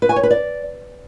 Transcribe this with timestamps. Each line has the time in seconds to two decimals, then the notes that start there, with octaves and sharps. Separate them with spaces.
0.02 B4
0.09 G#5
0.16 C#5
0.23 B4
0.31 D5